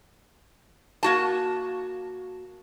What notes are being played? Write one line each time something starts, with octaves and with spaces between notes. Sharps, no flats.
A#3 F#4 A5